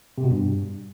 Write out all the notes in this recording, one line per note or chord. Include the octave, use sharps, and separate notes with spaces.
C3
B2
G2